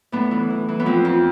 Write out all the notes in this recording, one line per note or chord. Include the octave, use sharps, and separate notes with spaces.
A2 B3 D4
E3
E3
E3
B3
F3 C4
F2